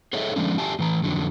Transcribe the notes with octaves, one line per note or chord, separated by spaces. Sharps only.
G#4 A4 C#5 D#5 E5
D3 F3 G#3 A3 C#4 D4
G4 D5 E5 G#5 A5
A2 E3 A#5
F2 D3 E3 F#3